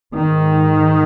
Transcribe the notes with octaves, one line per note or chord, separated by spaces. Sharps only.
G#2 D#3